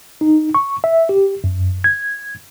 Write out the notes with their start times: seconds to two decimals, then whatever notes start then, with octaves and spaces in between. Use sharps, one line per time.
0.21 D#4
0.55 C#6
0.84 E5
1.09 G4
1.44 F#2
1.84 G#6